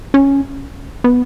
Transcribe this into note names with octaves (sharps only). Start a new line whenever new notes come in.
C#4
B3